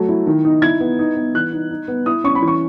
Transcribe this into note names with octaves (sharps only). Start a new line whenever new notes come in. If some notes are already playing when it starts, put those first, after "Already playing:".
Already playing: F#3 A3
E4
D#3
D#4
E4 G#6
B3
D#4
B3
E3 F#6
D#4
D#4
B3
E4 D#6
C#4 C#6
B5
E3
C#6